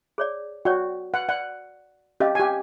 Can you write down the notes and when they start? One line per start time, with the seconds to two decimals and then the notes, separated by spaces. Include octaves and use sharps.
0.18 G#4 C#5 D5
0.65 F#4 C#5 D5 G5
1.14 F#5
1.29 D5 F#5
2.20 C#4 G4 D#5 F5
2.35 G4 G#5